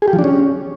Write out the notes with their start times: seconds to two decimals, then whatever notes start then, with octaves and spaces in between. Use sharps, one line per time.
0.02 G#4
0.08 G4
0.13 F3
0.19 D4
0.24 C#4